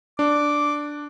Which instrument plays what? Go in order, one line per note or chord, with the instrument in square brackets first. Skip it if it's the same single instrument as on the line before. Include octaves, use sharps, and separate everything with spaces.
[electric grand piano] D4 [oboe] D6